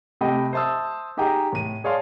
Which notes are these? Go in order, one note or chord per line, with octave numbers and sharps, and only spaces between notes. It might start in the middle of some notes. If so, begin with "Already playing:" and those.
C3 A3 G4 D#5 G5 B5
C5 E5 A5 D#6 E6
D#4 G4 G#4 D#5 G5 A#5
A2 D#7
G#4 C#5 D5 F5 A5 C6